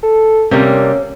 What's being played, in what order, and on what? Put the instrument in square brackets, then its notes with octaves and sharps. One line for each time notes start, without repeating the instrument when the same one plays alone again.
[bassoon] A4
[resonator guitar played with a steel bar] C3 G3 [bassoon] A#3 [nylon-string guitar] C4 C#4